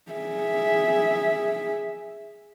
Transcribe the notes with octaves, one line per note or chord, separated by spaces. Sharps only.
G#4 E5